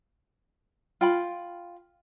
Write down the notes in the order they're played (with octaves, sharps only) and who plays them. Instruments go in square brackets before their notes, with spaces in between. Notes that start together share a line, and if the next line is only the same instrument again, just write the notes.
[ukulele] F4 G5 B5